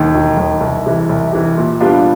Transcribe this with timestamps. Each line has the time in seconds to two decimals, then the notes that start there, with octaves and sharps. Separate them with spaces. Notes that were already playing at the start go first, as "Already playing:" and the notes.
Already playing: E1 D#2 D#3
0.14 E1
0.37 D#2 D#3
0.61 C2
0.86 C3 E3
1.09 C2
1.32 C3 E3
1.57 A#2
1.81 G3 B3 D4 F4